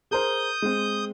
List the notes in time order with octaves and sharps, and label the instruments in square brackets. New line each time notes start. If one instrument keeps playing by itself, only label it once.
[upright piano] G#4 A#4 C5 [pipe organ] D#6 G6
[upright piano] G#3 C4